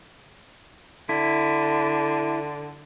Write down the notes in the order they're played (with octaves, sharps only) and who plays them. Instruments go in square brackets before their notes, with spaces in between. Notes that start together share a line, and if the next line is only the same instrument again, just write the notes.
[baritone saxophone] D3 [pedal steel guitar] E4